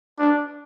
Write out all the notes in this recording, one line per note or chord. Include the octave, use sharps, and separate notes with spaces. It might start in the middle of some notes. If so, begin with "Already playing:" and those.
D4